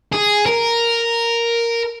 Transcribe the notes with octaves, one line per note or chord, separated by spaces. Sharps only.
G#4
A#4